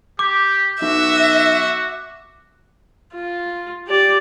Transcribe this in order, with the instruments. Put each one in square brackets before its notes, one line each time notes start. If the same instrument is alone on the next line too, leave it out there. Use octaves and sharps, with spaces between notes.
[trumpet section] G4 [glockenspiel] D6
[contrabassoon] B1 [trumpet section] F#4 [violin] E5
[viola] F4
G4 D5